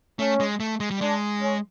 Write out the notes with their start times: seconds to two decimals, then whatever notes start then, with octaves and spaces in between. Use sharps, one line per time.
0.19 A3 C#4
0.40 G#3
0.60 A3
0.80 G#3
0.91 G3
1.00 G#3 D4
1.40 C#4